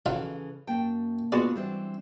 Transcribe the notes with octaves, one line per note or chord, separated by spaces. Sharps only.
C#3 E3 F#3 D#4 F4 A4
F#2 A#3 G5 A5
G#3 B3 D4 F4 F#4 D5
E3 G3 C4 D4